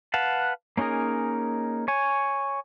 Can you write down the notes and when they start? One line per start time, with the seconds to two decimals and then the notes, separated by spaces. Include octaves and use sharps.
0.14 B4 F5 F#5 A5
0.77 A#3 C#4 D#4 G#4 A#4
1.88 C#5 G#5